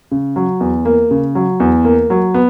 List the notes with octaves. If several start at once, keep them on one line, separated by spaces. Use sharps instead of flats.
C#3
F#3
E2
A#3
C#3
F#3
E2
A#3
F#3
B3